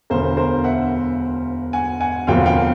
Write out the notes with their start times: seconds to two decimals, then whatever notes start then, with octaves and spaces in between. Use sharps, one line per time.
0.10 E1 D2 D3 A#4 C5
0.37 A#4 C5
0.64 E5 F#5
1.73 F#5 G#5
2.00 F#5 G#5
2.27 E1 D2 C3 F3 A#3 F5 G5
2.41 F#5
2.46 F5 G5